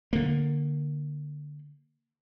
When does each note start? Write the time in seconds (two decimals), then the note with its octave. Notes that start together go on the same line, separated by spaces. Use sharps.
0.13 D3 A#3